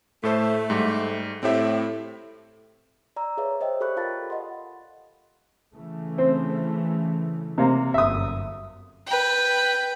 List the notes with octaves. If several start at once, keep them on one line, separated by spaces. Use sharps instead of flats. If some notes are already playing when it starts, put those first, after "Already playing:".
A2 A3 A4 C5
G#2 G3
A2 C4 G4 E5
D5 A#5 E6
G#4 B4 C#5 E5 F5
C5 D#5 E5 G5
G4 A4 D5 B5 C#6 F#6
F4 A#4 F5 A5 B5 A6
D#5 F#5 C6
C#3 E3 A3
C4
C3 A#3
G1 F#2 E5 D#6
B4 G5